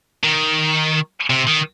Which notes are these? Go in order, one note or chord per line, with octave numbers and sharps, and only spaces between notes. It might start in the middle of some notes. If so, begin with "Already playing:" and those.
D#3
C3
D#3